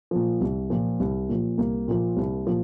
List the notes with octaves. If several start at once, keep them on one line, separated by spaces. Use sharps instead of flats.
A#2 F3
C2
A#2 F3
C2
A#2 F3
C2 A#3
A#2 F3
C2
A#2 F3